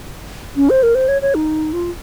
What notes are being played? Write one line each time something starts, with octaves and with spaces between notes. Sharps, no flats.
C#4
C5
A#4
C5
C#5
C#5
D#4
F4